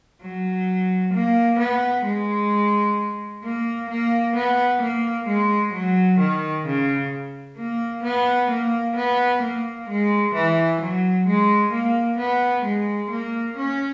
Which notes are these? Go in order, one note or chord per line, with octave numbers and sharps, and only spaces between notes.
F#3
A#3
B3
G#3
A#3
A#3
B3
A#3
G#3
F#3
D#3
C#3
A#3
B3
A#3
B3
A#3
G#3
E3
F#3
G#3
A#3
B3
G#3
A#3
C#4